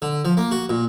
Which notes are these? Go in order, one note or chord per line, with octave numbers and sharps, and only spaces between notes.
D3
F3
A#3
F#4
A#2